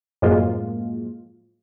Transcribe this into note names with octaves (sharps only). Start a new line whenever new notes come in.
F#2 A2 F3 G#3 A#3 F4